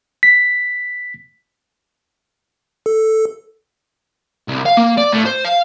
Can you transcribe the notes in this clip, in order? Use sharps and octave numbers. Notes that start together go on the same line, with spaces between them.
B6
A4
C2
F5
A#3
D5
A2
C5
F5